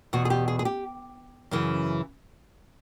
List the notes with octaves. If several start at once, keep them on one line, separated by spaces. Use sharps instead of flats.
E2 B2 F#4
G#4
G4
G#4
G#4
G4
F#2 C#3 E3